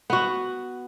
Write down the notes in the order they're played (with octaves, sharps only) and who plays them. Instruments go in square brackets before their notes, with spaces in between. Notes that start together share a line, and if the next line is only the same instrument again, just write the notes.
[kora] B3 F#4